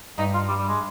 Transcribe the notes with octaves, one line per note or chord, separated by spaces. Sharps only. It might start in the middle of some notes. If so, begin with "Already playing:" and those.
G2 D#4
F4
G3
G3
G#3